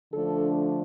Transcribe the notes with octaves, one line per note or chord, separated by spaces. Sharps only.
D3 F3 A3 D4 A4